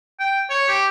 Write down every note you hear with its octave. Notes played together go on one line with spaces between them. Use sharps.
G5
C#5
G4